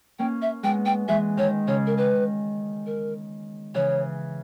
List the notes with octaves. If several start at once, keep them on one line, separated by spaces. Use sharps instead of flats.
A#3 C#4 G5
E5
G#3 B3 G5
G5
E3 G#3 E5
D#3 C#5
C#3 C#5
A#4
D#3 B4
A#4
C#3 E3 C#5